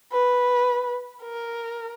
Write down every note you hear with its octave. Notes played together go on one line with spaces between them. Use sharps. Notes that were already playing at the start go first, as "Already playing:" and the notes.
B4
A#4